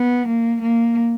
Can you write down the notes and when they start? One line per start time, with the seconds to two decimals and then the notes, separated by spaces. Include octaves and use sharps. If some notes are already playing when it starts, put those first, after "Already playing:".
Already playing: B3
0.28 A#3
0.62 A#3